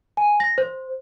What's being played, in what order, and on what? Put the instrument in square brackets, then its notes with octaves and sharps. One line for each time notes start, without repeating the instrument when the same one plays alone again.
[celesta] G#5
A#6
C5